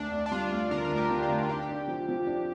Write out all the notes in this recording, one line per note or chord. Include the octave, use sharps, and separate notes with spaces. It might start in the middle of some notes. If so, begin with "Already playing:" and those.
Already playing: D2 D4
D2
D4
G3 F4
D2
D3 A#4
A#4
D2
G4
D3
F4
D2
F4
D4 G4
D4
F3
F3
D4